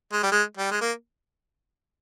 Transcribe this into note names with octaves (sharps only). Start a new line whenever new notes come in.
G#3
G3
G#3
G3
G#3
A#3